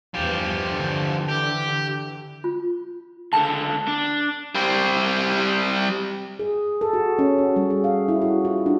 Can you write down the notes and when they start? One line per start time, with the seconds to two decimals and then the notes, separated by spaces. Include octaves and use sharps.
0.14 E2 G2 F3 G4
0.68 D3 E3
1.29 G4
2.44 F4
3.33 C#2 D3 A5
3.88 D4
4.55 G3 C4
6.39 G#4
6.81 A4
6.93 F#4
7.19 C#4
7.38 F#4
7.56 G3
7.70 G#4
7.84 F5
8.08 E4
8.22 F#4
8.45 F4
8.66 D4